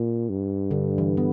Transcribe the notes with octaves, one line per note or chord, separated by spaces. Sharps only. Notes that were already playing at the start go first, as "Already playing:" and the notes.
Already playing: A#2
G2
D3
E3
B3